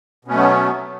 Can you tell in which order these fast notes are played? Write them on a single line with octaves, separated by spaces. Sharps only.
B2 C#4 A3 F#3 B3